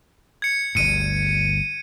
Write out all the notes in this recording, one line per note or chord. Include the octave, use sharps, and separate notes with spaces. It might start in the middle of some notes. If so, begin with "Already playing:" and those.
G#6 C#7
G1 D2 G2 C#7 D#7